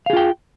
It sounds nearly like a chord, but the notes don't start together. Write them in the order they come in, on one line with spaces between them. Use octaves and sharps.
F5 G#4 F4 G5